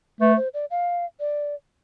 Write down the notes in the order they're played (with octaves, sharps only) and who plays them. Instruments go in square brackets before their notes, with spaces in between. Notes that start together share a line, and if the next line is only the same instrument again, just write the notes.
[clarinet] A3 [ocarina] B4
[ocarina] C5
D5
F5
D5